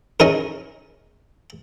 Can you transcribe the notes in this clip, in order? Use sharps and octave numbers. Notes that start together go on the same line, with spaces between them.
C#4 D#4 G#4 A#4